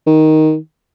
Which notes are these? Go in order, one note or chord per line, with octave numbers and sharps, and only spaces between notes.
D#3